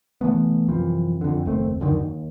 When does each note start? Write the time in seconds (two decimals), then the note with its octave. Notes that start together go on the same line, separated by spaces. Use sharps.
0.21 C2 E3 A3 B3
0.68 F#2 C3 E3 F3
1.21 F2 D3
1.45 F#1 D#2 A3 C4
1.80 C#2 F#2 D3 D#3
1.99 D#2